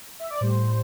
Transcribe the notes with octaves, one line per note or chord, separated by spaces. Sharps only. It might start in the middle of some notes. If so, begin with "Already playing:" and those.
E5
D5
A2 G3 C5